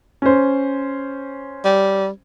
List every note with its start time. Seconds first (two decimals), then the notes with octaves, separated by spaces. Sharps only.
0.22 C#4 C5
1.65 G3